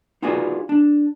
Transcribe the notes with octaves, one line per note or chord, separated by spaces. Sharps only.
D#4 F4 F#4 G#4 B4 D5
D4